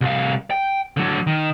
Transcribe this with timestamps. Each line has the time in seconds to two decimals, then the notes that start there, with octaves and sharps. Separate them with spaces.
0.01 C2 F5
0.51 G5
0.97 D3 F#3
1.27 D#3